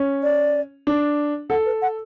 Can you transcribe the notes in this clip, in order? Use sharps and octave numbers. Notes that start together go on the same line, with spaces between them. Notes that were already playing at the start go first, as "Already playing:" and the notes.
Already playing: C#4
D5
D4
A4 F#5
B4
F#5